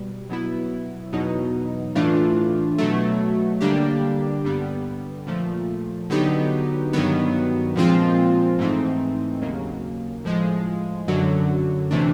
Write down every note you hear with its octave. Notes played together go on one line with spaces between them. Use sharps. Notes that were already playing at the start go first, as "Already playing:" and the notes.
Already playing: B2 G3
B2 F#3 B3 E4
E2 B2 F#3 B3 D#4
A2 E3 A3 D4 F4
B2 F#3 A3
D3 G3 A#3 D4 G4
G2 D3 G3 B3
A#2 F3 A3
D3 F#3 B3 D#4 G4
G2 D#3 F#3 B3
A#2 F3 G#3 C4 F4
G#2 E3 A3 C4 D#4
D#2 C#3 F#3 A#3
A2 F3 G#3
F#2 D3 F#3
C3 E3 A3 D4